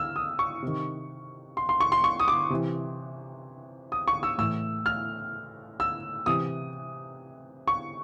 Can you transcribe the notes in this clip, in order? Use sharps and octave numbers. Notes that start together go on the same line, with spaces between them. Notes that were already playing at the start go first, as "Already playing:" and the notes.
Already playing: E6 F6
D#6
C#6
C3 D#3
C6
C6
C#6
C6
C#6
D#6
D6
C3 E3
D#6
C#6
E6
A2 E3 E6
F6
E6
C3 E3 D#6
C#6